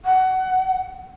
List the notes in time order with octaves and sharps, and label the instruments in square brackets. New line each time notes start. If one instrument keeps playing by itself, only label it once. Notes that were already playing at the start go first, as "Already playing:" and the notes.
[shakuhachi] F#5